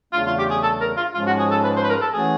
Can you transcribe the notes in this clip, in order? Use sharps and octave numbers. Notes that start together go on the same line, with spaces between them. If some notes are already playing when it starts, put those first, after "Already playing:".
E2 C#3 F#3 A3 D4 F4
F4
G4
G#4
A4
A#4
F4
G#2 F3 G#3 C#4 F4
F#4
G#4
A4
B4
C5
B4
A#4
A4
E3 A3 C#4 F#4 G#4